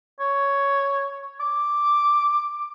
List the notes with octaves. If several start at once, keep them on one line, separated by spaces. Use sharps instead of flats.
C#5
D6